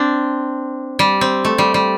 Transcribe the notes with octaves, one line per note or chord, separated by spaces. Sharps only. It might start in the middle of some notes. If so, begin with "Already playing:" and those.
Already playing: C4 D4
G3
C4
A3
G3
G3